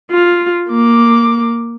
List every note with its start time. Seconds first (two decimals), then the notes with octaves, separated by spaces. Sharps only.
0.11 F4
0.70 A#3 D6